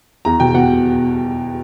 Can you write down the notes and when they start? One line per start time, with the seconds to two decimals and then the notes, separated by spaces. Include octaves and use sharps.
0.25 E2 A#5
0.40 B2 G5
0.55 B2 F#5